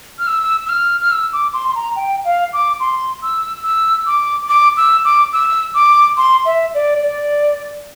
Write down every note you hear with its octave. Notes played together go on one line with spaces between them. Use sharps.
F6
E6
E6
F6
F6
E6
D6
C6
C6
A#5
G5
F5
D6
C6
E6
E6
D6
D6
E6
D6
E6
D6
C6
E5
D5
D5